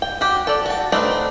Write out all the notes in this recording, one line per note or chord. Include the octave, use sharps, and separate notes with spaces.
G5
F#4 G4 G5
A4 D5
F#4 A5
A3 C4 D4 D#4 B4